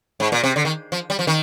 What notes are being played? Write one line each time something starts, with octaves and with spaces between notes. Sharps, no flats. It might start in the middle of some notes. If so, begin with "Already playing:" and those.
G#2
A#2
C3
D3
D#3
F3
G3
F3
D#3